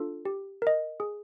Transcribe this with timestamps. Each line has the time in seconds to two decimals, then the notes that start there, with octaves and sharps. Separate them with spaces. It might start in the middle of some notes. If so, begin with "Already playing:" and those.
Already playing: D4 F4 A4
0.25 G4
0.62 A#4 D#5
1.00 G#4